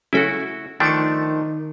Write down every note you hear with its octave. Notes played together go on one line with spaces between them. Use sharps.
C#3 F#3 A3 E4 F#4
D#3 F3 A3 D4 G5 A5 C#6